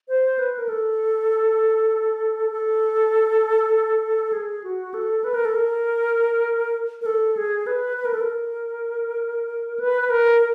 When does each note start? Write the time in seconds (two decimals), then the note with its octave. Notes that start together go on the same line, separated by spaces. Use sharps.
0.08 C5
0.39 B4
0.58 A#4
0.69 A4
2.51 A4
4.33 G#4
4.64 F#4
4.94 A4
5.24 B4
5.34 A#4
5.45 A4
5.55 A#4
7.01 A#4
7.06 A4
7.37 G#4
7.67 B4
7.97 B4
8.05 A#4
8.13 A4
8.21 A#4
9.80 B4
10.02 B4
10.10 A#4